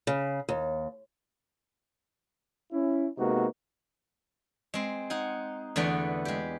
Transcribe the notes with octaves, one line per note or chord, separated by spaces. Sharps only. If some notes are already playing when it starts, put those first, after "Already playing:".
C#3
D#2
C#4 E4
C3 G#3 A#3 B3 D#4 F#4
G#3 C4
D#4 F#5 G#5
E2 D3 A3 B3 B4
G#3 G4